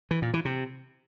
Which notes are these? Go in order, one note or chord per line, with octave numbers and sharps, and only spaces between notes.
E3
A#2
E3
C3